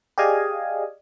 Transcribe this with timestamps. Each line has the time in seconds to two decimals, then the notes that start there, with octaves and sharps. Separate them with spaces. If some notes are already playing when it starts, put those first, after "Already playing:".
0.18 G4 G#4 D5 D#5 F5 G#5